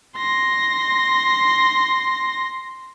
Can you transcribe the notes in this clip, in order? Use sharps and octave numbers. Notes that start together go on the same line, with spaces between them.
C6 A#6